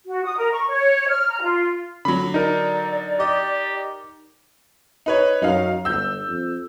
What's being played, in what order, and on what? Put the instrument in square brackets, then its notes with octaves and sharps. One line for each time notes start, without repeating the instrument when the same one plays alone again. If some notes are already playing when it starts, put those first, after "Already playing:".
[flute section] F#4
D#6
A#4
C#6
C#5
F6
A#5
F4
[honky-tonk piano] D3 F#3 [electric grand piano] B5
[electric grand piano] D#4 A#4 [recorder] D5
[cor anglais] G4 [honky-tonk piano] D#5
[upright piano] D#4 B4 C#5
[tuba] F#2 [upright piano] D#4 F5
[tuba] G1 [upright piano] E6 G6
[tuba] F2